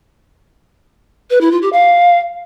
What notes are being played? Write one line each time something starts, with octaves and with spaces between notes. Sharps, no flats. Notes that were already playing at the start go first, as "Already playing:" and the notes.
B4
E4
F4
G4
F5